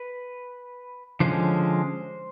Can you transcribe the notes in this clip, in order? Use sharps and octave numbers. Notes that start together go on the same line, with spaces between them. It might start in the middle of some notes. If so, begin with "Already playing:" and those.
Already playing: B4
D3 F3 G#3 C#4 C5